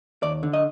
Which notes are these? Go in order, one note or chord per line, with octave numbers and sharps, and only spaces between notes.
D#2 D5
D3
D#5